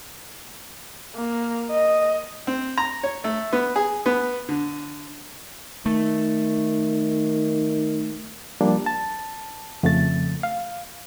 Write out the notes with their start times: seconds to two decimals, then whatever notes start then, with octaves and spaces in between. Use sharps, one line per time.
1.16 A#3
1.70 D#5
2.47 C4
2.78 A#5
3.03 C#5
3.24 A3
3.53 B3
3.76 G#4
4.06 B3
4.49 D3
5.86 D#3 A3
8.61 F3 G3 A#3 D4
8.86 A5
9.83 F2 C#3 F3 A3 A6
10.43 F5